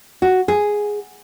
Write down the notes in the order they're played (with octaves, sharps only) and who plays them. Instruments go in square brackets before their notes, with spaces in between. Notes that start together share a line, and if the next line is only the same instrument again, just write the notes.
[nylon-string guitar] F#4
G#4